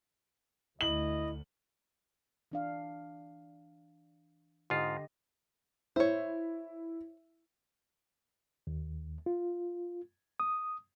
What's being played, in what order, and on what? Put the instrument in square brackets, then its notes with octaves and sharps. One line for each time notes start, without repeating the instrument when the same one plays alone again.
[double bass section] D2 [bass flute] E4 [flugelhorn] D#5 [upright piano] F#7
[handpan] E3 D4 F5
[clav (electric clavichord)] G#2 F4 [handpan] D3 G4 D#5
[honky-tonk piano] E4 E5 [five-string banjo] C5 C#5
[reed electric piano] D#2
F4
D#6